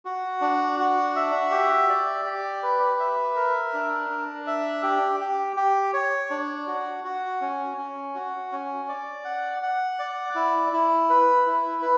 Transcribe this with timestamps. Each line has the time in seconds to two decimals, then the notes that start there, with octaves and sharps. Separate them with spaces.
0.05 F#4
0.41 D4
0.79 F#4
1.16 E5
1.52 G4
1.89 D5
2.25 G4
2.63 B4
3.00 E5
3.36 A#4
3.74 D4
4.10 D4
4.47 E5
4.83 G4
5.20 G4
5.56 G4
5.94 C#5
6.30 D4
6.67 F#4
7.04 F#4
7.41 C#4
7.77 C#4
8.15 F#4
8.52 C#4
8.89 D5
9.25 F#5
9.62 F#5
9.99 D5
10.35 E4
10.73 E4
11.10 B4
11.46 E4
11.82 B4